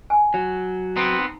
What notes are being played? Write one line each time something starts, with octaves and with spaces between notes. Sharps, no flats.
G#5
F#3
B3 C4 A#5
D#4